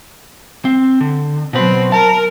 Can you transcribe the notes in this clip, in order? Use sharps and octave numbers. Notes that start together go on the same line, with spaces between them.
C4
D3
B2 F#3 C4 B4
A#4 A5